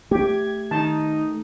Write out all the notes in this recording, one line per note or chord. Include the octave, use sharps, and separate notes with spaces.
A3 G4 G#6
D#3 D#4 A5